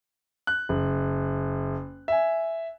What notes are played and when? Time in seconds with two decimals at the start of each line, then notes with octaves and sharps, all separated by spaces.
0.47 F#6
0.69 F#1
2.08 E5 G#5